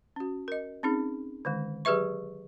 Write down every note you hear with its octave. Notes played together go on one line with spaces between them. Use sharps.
C#4 F#4
A#4 D#5
C4 C#4 D#4 G#4
D3 D#3 G#3
F#3 G4 G#4 B4 E5 C#6